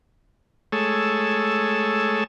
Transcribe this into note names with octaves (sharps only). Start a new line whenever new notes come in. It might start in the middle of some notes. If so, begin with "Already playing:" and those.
G#3 A3 G#4 A4 C#5 E6